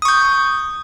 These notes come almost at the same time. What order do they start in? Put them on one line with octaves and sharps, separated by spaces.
D#6 C#6 G6